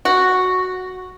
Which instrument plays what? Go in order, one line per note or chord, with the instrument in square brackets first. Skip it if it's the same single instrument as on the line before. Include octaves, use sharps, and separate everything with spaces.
[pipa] F#4